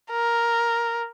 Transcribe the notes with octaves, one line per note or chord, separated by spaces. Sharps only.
A#4